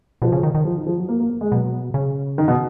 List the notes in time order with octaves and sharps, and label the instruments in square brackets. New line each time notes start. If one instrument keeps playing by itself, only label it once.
[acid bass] B2 [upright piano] F3
[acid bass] C#3
D#3
D#3
[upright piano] F3
D#3
F3
F#3
A#3
A#3
A#3
G#3
[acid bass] B2 [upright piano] F#3
[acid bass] C#3
[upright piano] D#3
B2